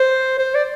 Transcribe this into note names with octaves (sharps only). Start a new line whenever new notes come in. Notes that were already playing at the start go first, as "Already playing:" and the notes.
Already playing: C5
C5
D5